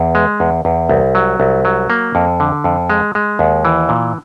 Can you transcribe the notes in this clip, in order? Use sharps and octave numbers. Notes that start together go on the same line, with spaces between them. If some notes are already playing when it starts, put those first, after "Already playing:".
Already playing: E2
G#3
E2
E2
C2
F#3
C2
F#3
A#3
F2
D3
F2
G#3
G#3
D#2
E3
A#2